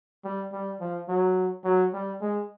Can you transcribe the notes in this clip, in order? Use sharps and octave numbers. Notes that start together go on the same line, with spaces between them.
G3
G3
F3
F#3
F#3
G3
G#3